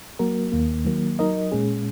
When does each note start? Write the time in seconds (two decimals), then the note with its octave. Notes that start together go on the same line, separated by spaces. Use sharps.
0.19 F#3 A#3 F#4 A#4
0.52 D#2 D#3 A#3
0.85 D#3 F#3 A#3
1.19 F#3 D#4 A#4 D#5
1.52 A#2 G#3 C#4 G#4